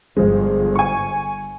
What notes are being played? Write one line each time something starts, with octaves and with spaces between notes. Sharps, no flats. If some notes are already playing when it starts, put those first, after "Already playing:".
G1 F3 G#3
G#5 C#6